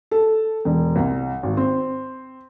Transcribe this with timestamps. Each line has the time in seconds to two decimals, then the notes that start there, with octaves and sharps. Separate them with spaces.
0.11 A4
0.65 E1
0.96 C2
1.43 G#1
1.57 C4